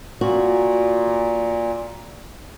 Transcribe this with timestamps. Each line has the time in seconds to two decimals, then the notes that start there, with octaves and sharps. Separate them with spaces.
0.21 A#2 F#4